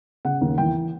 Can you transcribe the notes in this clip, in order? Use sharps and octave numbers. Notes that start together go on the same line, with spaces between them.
C#3 F#5
D#2
E3 G5